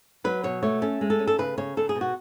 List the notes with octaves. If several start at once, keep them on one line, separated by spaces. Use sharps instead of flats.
F#3 B4
B2 C#5
A3 C#5
C#4 A4
G#3
A4
C#4
A4
C#3 B4
C#3 C#5
C#3 A4
G#4
B2
F#4